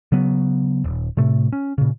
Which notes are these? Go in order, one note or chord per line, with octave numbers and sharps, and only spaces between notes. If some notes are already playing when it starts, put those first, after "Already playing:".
C#3 F#3 B3
D#1
A2 C3 A3
C#4
A#2 C#3